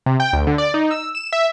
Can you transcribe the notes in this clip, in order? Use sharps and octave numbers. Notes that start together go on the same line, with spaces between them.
C3
G5
D2
D3
D5
D#4
E6
E7
E5